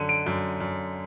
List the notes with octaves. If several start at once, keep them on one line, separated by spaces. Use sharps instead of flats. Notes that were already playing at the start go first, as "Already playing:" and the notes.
Already playing: F#2 D3 D#7
D7
F#2
F#2